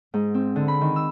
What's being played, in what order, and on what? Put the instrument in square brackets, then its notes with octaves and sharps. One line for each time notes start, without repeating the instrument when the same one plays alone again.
[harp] G#2
C4
D3
B5
D#3
E6